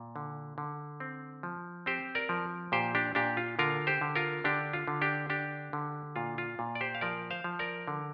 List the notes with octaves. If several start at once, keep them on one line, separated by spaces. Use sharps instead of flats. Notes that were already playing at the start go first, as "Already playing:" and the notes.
Already playing: A#2
D3
D3
C4
F3
C4 G4 C5
A#4 D5
F3
A#2 G4 C5
D4 G4
A#2 D4 G4
F4
D3 F4 A#4
G4 C5
D3
F4 A#4
D3 D4 G4
F4
D3
D4 G4
D4 G4
D3
A#2 F4
F4
A#2
D5
G4 C5
F5
F3 A#4 D5
C5 F5
F3
A#4 D5
D3